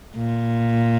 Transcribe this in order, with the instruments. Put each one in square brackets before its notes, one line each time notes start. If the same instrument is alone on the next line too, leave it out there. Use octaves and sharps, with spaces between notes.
[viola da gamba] A#2